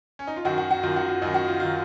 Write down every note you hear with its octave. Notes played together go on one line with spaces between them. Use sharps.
C#4
D#4
F4
F#2 D#3 F#4
F#4
F#4
F#2 D#3 F4
F#4
F4
F#2 D#3 D#4
F#4
F4
D#3 F4